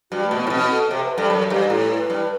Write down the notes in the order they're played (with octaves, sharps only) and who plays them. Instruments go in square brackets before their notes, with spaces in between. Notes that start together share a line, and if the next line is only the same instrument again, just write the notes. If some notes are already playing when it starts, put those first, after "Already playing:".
[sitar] G2 [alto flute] F#4
[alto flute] A3
[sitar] B2
[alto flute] B3
[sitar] A2
[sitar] B2 [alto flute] C4
[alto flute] A4
[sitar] C3
[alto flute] B4
[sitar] G2 [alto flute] A4
[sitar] F#2 [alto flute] A4
[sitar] G2 [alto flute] G4
[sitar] A2 [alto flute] A4
[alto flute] B4
[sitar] G2